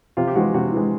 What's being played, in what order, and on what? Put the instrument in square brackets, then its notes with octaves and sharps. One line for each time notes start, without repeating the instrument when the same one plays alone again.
[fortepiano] C3 F4
G4
E3 G#3 F#4
C3 F#4
E3 G#3